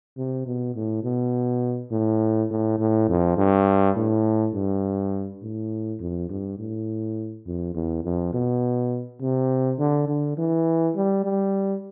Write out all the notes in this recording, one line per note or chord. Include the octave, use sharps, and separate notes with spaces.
C3
B2
A2
B2
A2
A2
A2
F2
G2
A2
G2
A2
F2
G2
A2
F2
E2
F2
B2
C3
D3
D3
E3
G3
G3